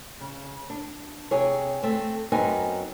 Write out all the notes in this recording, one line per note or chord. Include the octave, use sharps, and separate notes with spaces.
C#3
D4
C3 G#4 C#5
A3 C4
F#2 B3 C4 D#4 G#5